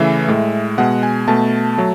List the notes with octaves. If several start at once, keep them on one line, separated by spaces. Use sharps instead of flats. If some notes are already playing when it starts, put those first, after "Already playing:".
Already playing: C#3 E3 A3 E5
A2 G#3
B2 G#3 F#5
G#5
B2 A3 A5
F#3 A3